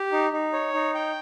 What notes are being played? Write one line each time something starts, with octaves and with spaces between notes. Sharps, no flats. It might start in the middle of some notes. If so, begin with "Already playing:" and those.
Already playing: G4
D#4
D#4
C#5
D#4
G5